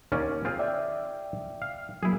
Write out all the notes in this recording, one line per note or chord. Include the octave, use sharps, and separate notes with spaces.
D#2 C#4 D5
C4 F4 G#4
D5 E5 G5
F5
F#3 A#3 E4 G#4